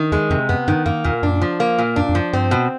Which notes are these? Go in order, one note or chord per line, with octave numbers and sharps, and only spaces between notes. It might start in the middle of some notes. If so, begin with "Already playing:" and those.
Already playing: D#3
E2 G#3
F2 C3
F#2 B3
G2 D#3
F#2 A#3
E2 A#2
F#2 D4
F3
A#3
A#2
F#2 D4
F2
F#2 F3
G2 C4
B2